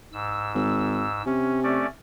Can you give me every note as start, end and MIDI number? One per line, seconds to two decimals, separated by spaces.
0.13 1.22 44
0.13 1.22 88
0.55 1.05 32
1.26 1.86 48
1.26 1.60 61
1.63 1.86 57
1.63 1.86 61
1.63 1.86 74